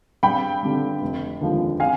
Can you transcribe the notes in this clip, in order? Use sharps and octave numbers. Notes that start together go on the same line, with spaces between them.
G2 G5 B5
D3 G3
F1
D#2 D3 F3 G#3
F5 G#5